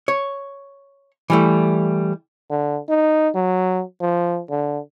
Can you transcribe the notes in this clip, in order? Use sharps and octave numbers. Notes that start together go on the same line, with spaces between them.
C#5
E3 G3 A3
D3
D#4
F#3
F3
D3